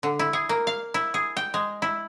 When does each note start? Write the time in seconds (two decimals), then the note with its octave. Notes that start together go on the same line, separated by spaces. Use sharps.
0.03 D3
0.19 E4
0.33 G#4
0.49 A#3
0.67 F5
0.94 E4
1.14 G#4
1.37 G5
1.54 G#3
1.82 E4